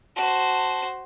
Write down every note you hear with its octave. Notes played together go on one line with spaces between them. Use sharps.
F#4 C5 A5